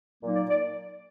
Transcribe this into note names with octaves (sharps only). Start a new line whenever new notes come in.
A#2 F#3 A#3 D#4
D5
D5